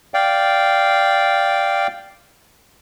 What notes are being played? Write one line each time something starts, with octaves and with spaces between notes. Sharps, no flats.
D5 F5 G5